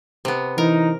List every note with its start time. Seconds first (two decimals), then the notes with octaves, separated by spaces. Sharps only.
0.25 C3 B3
0.58 E3 D#4 A#4